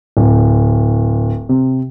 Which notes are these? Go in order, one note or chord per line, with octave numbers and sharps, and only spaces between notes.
D1
C3